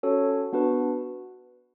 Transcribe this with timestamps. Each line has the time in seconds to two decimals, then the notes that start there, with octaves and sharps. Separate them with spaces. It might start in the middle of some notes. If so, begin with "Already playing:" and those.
0.03 C#4 F#4 A4 C#5
0.53 B3 D4 F#4 B4